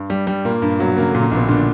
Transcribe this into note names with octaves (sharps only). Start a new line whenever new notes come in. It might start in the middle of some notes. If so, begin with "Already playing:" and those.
Already playing: G2
G3
G3
A#2 A#3
G2
B2 F#3
C#3 A#3
D3
A#2
C#3
A#1 B2
A#2 D3